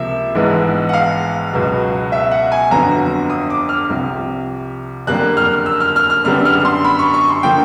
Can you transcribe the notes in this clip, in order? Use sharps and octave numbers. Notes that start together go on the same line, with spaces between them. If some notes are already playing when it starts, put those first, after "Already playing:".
Already playing: C#2 C3 F3 A#3 E5
A#1 G#2 E3 G#3 B3
F#5
F5
C#2 B2 F#3 B3
E5
F#5
G#5
G1 F2 D3 F#3 B3 A#5
D#6
D6
F6
C2 C3 F3
F#1 F2 D3 G3 A#3 F#6
F6
E6
F6
F6
F6
F#2 D3 G3 B3 F6
F6
C6
B5
C#6
C#6
C6
D3 F3 A#3 G5